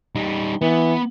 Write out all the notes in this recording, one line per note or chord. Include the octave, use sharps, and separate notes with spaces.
G3 D#4
E3 B3